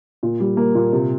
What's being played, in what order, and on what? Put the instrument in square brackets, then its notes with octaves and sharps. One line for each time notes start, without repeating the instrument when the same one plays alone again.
[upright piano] A#2
G3
A#3
A#2
C3